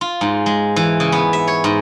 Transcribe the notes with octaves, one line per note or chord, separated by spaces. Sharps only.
F4
G#2
G#3
E3
C#3
B3
E5
C#5
G#2